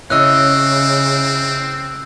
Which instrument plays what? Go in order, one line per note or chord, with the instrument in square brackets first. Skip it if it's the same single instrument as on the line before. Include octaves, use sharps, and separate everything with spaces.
[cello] C#3 [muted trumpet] C4 [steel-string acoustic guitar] E4 C#5 D#5 [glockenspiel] E6 F#6